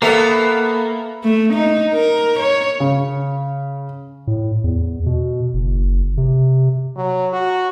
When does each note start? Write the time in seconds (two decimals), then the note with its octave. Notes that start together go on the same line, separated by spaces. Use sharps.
0.02 A#3 B3 A4 E5
1.24 A3
1.54 D#4
1.94 A#4
2.39 C#5
2.80 C#3
4.27 A2
4.64 E2
5.06 B2
5.54 F#1
6.17 C3
6.96 F#3
7.33 F#4